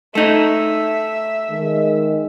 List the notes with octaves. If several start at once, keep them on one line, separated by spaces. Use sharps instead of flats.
A3 D#4 E5
D#3 G#3